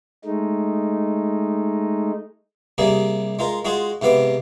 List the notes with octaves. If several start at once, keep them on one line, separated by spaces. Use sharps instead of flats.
G#3 A3 D#4
C3 G3 A#3 G#4
G#3 F4 A#4
G#3 F4 F#4 G#4
G#2 C3 B3 F5 D6